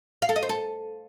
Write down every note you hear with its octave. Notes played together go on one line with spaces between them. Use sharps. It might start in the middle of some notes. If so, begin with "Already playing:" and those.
F5
A4
D#5
C5
A4